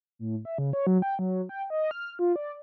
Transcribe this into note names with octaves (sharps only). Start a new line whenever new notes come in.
A2
E5
C#3
C#5
F#3
G5
F#3
G5
D#5
F6
F4
D5